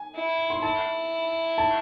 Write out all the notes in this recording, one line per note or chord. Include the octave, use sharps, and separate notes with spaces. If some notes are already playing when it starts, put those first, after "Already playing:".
Already playing: G#5
E4
C6
E4 A5
A5